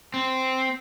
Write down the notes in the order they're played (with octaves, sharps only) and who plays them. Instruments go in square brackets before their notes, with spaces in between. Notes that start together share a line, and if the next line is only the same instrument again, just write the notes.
[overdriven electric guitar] C4